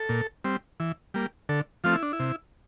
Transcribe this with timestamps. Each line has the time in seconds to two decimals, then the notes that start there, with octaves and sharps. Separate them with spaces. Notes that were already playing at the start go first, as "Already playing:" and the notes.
Already playing: A4
0.09 A#2
0.44 G3 C4
0.80 E3
1.14 G3 A#3
1.49 D3 A4
1.84 F3 A3 C4 F4
1.93 E4
2.03 D4
2.13 E4
2.20 C3